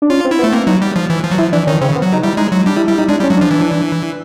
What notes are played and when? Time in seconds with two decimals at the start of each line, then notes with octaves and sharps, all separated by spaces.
0.02 D4
0.10 C#4 F4
0.25 C4
0.31 E4
0.39 B3
0.44 A3
0.53 A#3 C4
0.67 F#3 D#4
0.82 G3
0.96 F3
1.10 E3
1.24 F3
1.32 F#3
1.38 F3 E4
1.53 E3 D4
1.67 D#3 C#4
1.81 C#3 C4
1.95 B3
2.02 F#3
2.13 D#4
2.23 G3 E4
2.37 G#3 D#4
2.52 F#3
2.66 G3 D4
2.77 E4
2.87 G3 E4
2.98 D#4
3.08 G#3 D4
3.20 G3
3.23 C#4
3.30 F#3
3.37 F3 D4
3.51 E3